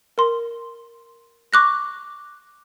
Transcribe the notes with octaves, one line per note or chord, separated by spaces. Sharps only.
A#4 C6
C#6 D6 F#6 A#6